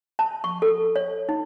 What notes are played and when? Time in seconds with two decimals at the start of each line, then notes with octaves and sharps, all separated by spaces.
0.19 A5
0.44 C#6
0.62 A4
0.96 C#5
1.29 D#4